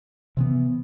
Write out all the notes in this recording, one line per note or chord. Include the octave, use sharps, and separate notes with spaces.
C3 E3 B3